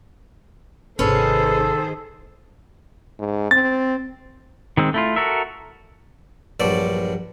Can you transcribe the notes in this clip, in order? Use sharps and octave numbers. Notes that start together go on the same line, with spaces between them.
G#1 C3 D#3 C#4 G#4 A4 B4 C5
G#2
C4 A6
D#3 G#3 C4
A3 E4 F4
F#4 A4 A#4 E5
A#1 G2 F#3 D5